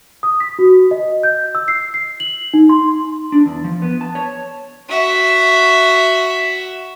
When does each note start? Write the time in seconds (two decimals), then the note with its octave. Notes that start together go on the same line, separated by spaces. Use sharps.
0.23 D#6
0.40 B6
0.59 F#4
0.91 D#5
1.23 G6
1.55 E6
1.68 C7
1.94 C7
2.20 F#7
2.54 D#4
2.69 C6
3.32 D4
3.46 E2
3.64 F3
3.82 B3
4.01 A5
4.15 C#5
4.89 F#4 E5